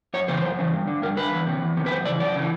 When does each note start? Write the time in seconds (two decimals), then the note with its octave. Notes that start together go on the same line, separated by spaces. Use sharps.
0.14 F#2 C#5
0.28 C#3 E3 C5
0.44 F#2
0.59 C#3 E3
0.74 G2
0.87 D3
1.02 G2 A#4
1.17 D3 B4
1.33 E2
1.47 C3 D#3
1.62 E2
1.77 C3 D#3
1.86 B4
1.91 F#2 C5
2.05 C#3 E3 D5
2.20 F#2 D5
2.36 C#3 E3